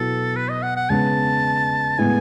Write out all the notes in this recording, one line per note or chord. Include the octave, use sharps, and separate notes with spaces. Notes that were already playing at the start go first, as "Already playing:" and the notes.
Already playing: B2 F#3 B3 E4 A4
B4
D#5
F#5
F#5
C#3 G#3 B3 A5
A2 G#3 B3 G#5